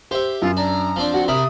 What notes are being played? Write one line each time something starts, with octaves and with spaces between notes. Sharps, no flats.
G4 C5 E5
F#2 F4
D4 A#5
F3 C4 D4
F#4 F#5
C3 A#4 E5 B5 D#6